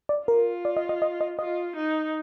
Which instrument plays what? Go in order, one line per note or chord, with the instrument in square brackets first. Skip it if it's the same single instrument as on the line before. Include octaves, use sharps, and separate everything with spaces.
[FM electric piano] D5
[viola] F4 [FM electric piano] A#4
[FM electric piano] D5
D#5
D#5
D#5
D#5
[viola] F4 [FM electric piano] D#5
[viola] D#4